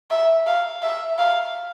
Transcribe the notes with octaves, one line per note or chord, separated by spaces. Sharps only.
E5
F5
E5
F5